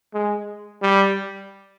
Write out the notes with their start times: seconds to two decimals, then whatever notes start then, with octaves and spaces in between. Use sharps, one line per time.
0.13 G#3
0.82 G3